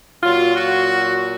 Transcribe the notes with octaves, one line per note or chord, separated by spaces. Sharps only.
A#2 F#3 F4
F#4